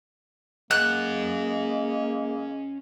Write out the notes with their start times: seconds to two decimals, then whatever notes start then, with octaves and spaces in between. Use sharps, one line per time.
0.71 G#3 A#3 C#4 F#5 F#6